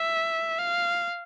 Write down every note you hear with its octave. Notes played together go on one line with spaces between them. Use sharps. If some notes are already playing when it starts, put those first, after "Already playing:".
Already playing: E5
F5